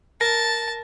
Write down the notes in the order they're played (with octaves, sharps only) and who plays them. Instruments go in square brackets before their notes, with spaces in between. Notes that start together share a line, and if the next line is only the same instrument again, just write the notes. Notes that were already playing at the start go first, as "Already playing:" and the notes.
[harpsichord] A#4 [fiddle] A5 [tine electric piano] A#6